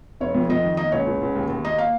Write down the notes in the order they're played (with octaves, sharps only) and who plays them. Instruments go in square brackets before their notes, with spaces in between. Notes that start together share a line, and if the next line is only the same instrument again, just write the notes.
[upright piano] F1 [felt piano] C#5
[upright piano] F2
[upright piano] F2 [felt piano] D#5
[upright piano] D#3
[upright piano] A#3 [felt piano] D#5
[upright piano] C#2 [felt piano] C#5
[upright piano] C#2
C#2
D#2
D#2
[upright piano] A#3 [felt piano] D#5
[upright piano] A#3 [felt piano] F5